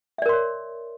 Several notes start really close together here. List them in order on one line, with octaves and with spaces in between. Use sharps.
E5 D5 A#4 C6 C#5